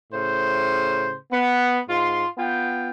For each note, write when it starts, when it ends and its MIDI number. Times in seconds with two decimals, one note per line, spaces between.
0.12 1.15 45
0.12 1.15 49
0.12 1.15 72
1.32 1.77 59
1.89 2.25 44
1.89 2.25 65
1.89 2.25 84
2.37 2.90 59
2.37 2.90 65
2.37 2.90 79